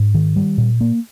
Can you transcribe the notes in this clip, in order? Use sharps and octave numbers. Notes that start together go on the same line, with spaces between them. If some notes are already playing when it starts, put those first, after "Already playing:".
Already playing: G#2
D#3
G3
A#2
A#3